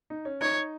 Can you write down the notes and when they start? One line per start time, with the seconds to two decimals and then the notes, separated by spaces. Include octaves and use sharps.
0.10 D#4
0.25 C#4
0.41 D#4 C#5